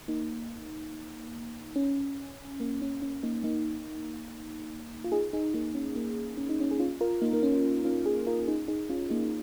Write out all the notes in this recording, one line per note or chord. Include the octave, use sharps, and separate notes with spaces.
A#3 D#4
C#4
A#3
C#4
C#4
A#3 D#4
A#3 D#4
F4
D#4 G#4
D#4 G#4
A#3 D#4
C#4
A#3
C#4
D#4
C#4
G#4
C#4 F4
F4 A#4
A#3 D#4
A#3
C#4
C#4 F4
D#4 G#4
F4 A#4
D#4 G#4
D#4 G#4
C#4 F4
A#3 D#4